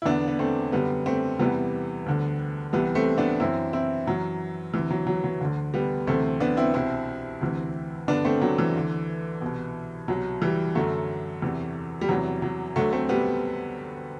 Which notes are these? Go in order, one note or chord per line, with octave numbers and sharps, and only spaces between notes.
E4
E2 D3 B3 D4
B3
A3 C4
F#2 D3 G3 B3
A3 C4
E2 C3 E3 G3 B3
D2 D3
C2 C3 E3 G3 B3
A3 C4
B3 D4
F#2 E3 C4 E4
C4 E4
F#2 E3 F#3
D2 C3 E3
F#3
F#3
F#3
D2 D3
G3 B3
D2 C3 E3 A3 C4
B3 D4
C4 E4
C2 B2 C4 E4
D2 C3 E3
G2 D3 B3 D4
A3 C4
F#3 A3
E3
D2 D3
C2 B2
C2 B2 F#3
E3 G3
F#2 D3 F#3 A3
E2 C3 E3
G3
E2 C3 E3 F#3
F#3
D2 D3 F#3 A3
A3 C4
G3 B3